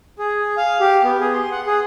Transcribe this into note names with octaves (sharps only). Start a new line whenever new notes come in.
G#4
F5
G4
B3
G#4
C6
F#5
G#4